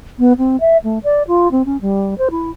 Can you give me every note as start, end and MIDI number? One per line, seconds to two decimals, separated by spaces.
0.19 0.33 59
0.38 0.57 60
0.61 0.77 76
0.84 0.99 57
1.04 1.23 74
1.28 1.51 65
1.51 1.62 60
1.66 1.77 61
1.81 2.17 55
2.18 2.29 72
2.31 2.51 64